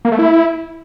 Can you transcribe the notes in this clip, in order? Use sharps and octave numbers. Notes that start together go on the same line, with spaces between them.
A#3
A3
E4